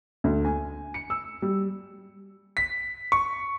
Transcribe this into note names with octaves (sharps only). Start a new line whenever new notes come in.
D2
G#5
C#7
E6
G3
B6
C#6